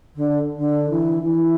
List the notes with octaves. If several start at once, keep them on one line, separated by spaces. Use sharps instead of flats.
D3
D3
E3
E3